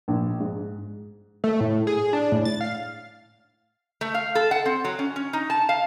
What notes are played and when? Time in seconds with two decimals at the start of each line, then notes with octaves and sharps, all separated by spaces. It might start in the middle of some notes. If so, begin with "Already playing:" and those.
0.08 A#1
0.40 G#2
1.44 A3
1.60 A2
1.87 G#4
2.13 D4
2.32 A2
2.45 A6
2.61 F5
4.01 A3
4.14 F5
4.35 A4
4.51 F#5
4.66 C4
4.85 F#3
4.99 C#4
5.16 C#4
5.33 D#4
5.50 A5
5.69 F5